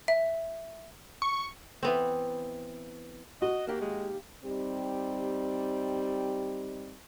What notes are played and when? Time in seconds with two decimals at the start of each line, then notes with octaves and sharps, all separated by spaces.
0.08 E5
1.22 C#6
1.83 E3 B3 C4
3.42 F#4 D#5
3.67 D#2 A#3 G4 F5
3.81 G#3
4.44 G3 C4 D#4 G4